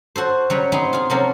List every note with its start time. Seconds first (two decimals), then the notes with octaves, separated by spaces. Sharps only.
0.16 F#4 A4 C5
0.50 C#3 F#3 G3 B4 C#5 A#5
0.72 B3 C4 D#4 G#4
0.93 F4 G#4
1.10 C3 F3 F#3 A#3 C#4 A4